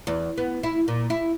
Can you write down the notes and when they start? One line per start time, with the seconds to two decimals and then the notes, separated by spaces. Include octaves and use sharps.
0.07 E2
0.38 B3
0.63 E4
0.88 A#2
1.10 E4